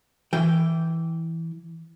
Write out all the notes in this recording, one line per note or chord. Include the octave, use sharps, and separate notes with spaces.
E3 G5